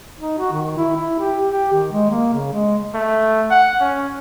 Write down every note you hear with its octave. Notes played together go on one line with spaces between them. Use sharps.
D#4
F#4
D#3
E4
E4
G4
G4
D#3
G#3
A#3
C#3
G#3
A3
F#5
C#4